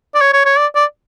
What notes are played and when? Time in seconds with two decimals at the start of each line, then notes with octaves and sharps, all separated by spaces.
0.14 D5
0.21 C#5
0.33 C#5
0.45 C#5
0.57 D5
0.76 D5